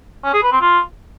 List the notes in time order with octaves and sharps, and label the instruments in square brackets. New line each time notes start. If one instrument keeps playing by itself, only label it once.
[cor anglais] C#4
G#4
B4
C4
F4